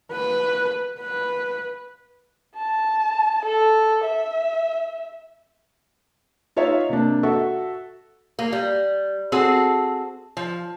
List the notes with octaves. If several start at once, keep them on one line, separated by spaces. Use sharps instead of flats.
B4
B4
A5
A4
E5
D#4 F4 C#5 E5 F5
C3 A#3 D4
F#4 A4 E5
A#3
G3
C4 F#4 G#4 A4
F3